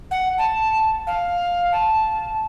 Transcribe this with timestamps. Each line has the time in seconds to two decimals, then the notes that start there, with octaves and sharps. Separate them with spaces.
0.11 F#5
0.38 A5
1.07 F5
1.72 A5